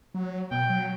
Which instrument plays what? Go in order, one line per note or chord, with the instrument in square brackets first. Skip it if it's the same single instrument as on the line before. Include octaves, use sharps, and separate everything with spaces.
[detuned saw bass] F#3
[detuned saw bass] B2 [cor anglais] G5
[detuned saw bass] F#3